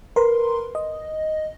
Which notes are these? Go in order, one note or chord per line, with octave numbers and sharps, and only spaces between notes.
A#4 B4 C6
D#5